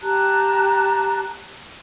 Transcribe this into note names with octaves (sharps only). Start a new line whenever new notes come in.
G4 A5 A#5 F#6